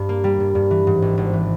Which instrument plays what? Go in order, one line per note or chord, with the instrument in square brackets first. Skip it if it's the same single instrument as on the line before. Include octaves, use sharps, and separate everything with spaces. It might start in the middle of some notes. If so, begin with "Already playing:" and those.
Already playing: [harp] G2
A#3
G3
G2
G2
E3
G#2
G#1
G#1
E3